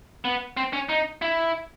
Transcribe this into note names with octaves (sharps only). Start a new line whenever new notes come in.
B3
C4
C#4
D#4
E4